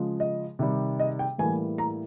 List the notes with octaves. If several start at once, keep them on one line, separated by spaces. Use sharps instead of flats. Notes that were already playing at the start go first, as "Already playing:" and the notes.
Already playing: C#3 F3 G#3
D#5
C3 D#3 G3
D#5
G5
A2 E3 G3 A#3 G#5
A#5